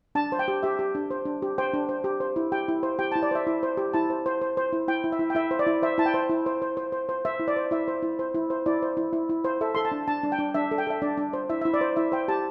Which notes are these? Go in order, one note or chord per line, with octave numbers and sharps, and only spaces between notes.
D4 A5
C5
G5
G4
G4 E5
G4
D4
C5
D4
G4
C5 G5
D4
C5
G4
C5
E4
G4 G5
E4
C5
G4 G5
E4 A5
D5
C5 E5
E4
C5
G4
E4 A5
C5
C5
C5
C5
E4
E4 G5
E4
E5
E4
G5
E4 E5
C5
D5
E4
C5 E5
E4 A5
G5
C5
E4
C5
C5
C5
C5
C5
C5 E5
E4
D5
C5
E4 E5
C5
E4
C5
E4
C5
E4 D5
C5
E4
E4
E4
C5
A4 E5
A4 C6
A5
D4
D4 A5
D4
G5
D4
D4 E5
A4
G5
A4 E5
D4 D5
D4
C5
E4 E5
E4 E5
D5
C5
E4 E5
C5 G5
G4 A5